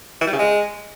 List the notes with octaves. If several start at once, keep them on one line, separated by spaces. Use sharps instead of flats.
E3
G3
C#3
G#3